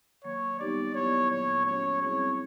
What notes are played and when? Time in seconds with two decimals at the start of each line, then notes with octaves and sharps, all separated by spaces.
0.24 D#3 F#3 A#3 C#5
0.60 G3 B3 D#4 G4 D5
0.95 D#3 F#3 B3 E4 G4 C#5
1.31 A#2 F#3 A#3 C#5
1.66 F#3 A3 C#4 F#4 C#5
2.02 G3 C4 E4 G#4 C#5